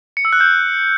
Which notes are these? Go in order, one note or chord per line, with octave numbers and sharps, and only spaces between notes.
C#7
E6
F#6
G6